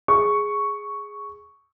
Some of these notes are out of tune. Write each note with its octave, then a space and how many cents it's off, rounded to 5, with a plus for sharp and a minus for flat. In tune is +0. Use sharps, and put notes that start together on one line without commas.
G#4 +0 C#6 +0